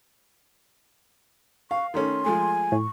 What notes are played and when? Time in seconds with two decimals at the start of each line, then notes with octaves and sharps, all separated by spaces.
1.71 F5 C#6
1.94 D#3 A3 C#4 C6
2.25 F3 G#3 A3 G#5
2.72 A2 C#6